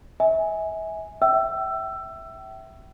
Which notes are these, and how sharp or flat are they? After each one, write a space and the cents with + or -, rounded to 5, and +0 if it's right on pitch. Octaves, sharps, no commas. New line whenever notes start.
E5 -35 G#5 +0
E5 +0 G5 -35 E6 +20